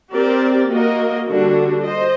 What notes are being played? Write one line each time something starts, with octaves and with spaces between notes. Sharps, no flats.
C4 G4 A#4 D5
A#3 F#4 A#4 D#5
D3 G3 D4 F#4
C5 D#5